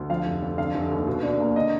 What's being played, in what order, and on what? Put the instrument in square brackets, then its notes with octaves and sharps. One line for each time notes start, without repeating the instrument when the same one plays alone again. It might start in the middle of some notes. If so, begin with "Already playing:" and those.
Already playing: [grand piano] D2
F3 F5
F1
F2
D3 F5
F1
D#2
B2
D4
A#3
D3 D#5